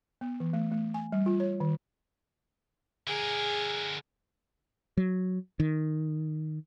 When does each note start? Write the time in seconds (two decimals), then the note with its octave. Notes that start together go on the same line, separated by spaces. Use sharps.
0.21 B3
0.40 E3
0.53 A3
0.72 A3
0.94 G#5
1.12 G3
1.26 F4
1.40 C#5
1.60 D#3
3.07 D3 G#4 A#4
4.97 F#3
5.60 D#3